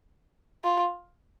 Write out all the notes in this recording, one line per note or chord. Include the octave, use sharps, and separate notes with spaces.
F4